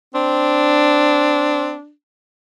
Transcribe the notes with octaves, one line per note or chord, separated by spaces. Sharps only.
C4 D4